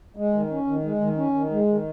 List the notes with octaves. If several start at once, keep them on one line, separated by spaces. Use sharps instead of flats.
G#3
D#3
C#4
D#3
G#3
D#3
C#4
D#3
G#3
D#3